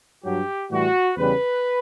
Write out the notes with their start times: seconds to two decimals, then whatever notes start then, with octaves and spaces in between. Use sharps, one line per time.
0.25 G2 F#3 G4
0.71 A2 E3 G3 F#4
1.17 E2 C#3 G3 B4